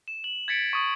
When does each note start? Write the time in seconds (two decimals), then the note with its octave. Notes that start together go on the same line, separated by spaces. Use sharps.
0.08 E7
0.24 F#7
0.48 G#6 A6 B6 C#7 D7
0.73 C#6 D#6 F#7